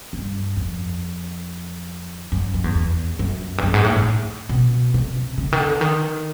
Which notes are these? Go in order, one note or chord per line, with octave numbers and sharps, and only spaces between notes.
G2
F2
F#2
F#2
E2
E2
F#2
G2
F#2
G#2
A2
A2
B2
C3
C#3
D#3
D3
D#3